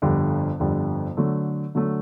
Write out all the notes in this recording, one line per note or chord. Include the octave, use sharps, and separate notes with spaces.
G1 F2 D3 G3
G1 F2 D3 G3
D3 F#3 A3
D3 F#3 A3